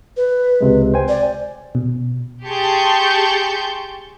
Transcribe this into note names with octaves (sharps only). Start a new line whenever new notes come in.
B4
C#2 C3 G#3
C5 G5 G#5
D5
B2
G4 G#4 A5 C6 C#6 G6